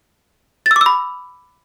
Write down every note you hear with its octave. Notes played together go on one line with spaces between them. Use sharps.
A6
E6
D6
E6
B5